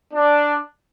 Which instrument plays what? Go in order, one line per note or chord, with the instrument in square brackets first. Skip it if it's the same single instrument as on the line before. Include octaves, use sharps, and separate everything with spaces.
[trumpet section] D4